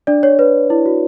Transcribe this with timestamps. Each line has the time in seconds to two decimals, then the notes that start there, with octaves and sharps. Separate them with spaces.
0.07 D4 D5
0.23 C#5
0.39 B4
0.70 E4
0.86 F#4